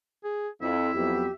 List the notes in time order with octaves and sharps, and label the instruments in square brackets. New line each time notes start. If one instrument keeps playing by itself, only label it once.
[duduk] G#4
[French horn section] F2 [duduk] E4 [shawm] E5
[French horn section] F2 F#3 B3 [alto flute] G4